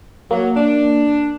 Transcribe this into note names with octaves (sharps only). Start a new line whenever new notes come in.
F#3 A#3
D4